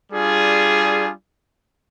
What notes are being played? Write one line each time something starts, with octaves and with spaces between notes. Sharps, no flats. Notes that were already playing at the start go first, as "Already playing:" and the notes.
G3 D4 F4 G#4